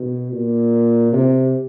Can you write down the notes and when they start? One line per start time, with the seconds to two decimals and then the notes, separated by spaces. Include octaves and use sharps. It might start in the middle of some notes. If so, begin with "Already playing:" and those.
Already playing: B2
0.32 A#2
1.13 C3